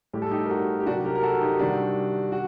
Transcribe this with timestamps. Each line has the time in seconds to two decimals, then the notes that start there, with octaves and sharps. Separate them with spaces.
0.13 A2 G3 G4
0.22 A4
0.31 D#4 G4
0.45 A#4
0.50 F#4 A4
0.80 G4
0.86 C3 F#3 D4 F#4
1.05 G4 A#4
1.15 A#4
1.23 F#4 A4
1.41 D#4 G4
1.59 C3 D#3 G3 D4 F#4
2.32 F#4